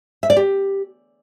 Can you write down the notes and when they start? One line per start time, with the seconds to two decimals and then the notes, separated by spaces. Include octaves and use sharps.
0.23 E5
0.30 D5
0.36 G4